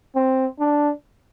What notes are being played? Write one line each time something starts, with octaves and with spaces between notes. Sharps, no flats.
C4
D4